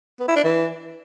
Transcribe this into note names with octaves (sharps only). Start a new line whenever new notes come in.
B3
E4
D4
E3